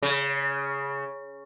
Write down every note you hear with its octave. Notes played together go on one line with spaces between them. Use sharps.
C#3